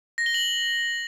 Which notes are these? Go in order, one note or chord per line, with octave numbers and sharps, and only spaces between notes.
A#6
G7
F#7